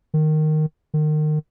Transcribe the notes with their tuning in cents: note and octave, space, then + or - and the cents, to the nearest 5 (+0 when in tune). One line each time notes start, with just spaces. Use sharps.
D#3 -10
D#3 -30